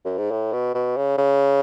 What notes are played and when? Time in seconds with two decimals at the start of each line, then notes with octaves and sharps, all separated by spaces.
0.05 F#2
0.18 G#2
0.31 A2
0.53 B2
0.75 B2
0.97 C#3
1.18 C#3